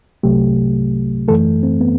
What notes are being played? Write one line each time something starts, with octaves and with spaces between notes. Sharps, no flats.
C2 C3 F#3 A3 G4
F#2 E3 A3 A4
C4
B3